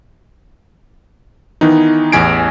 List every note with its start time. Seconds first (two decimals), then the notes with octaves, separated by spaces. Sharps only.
1.61 D#3 E3 B3 D#4
2.12 A1 E2 G#5 G#6 C7 D7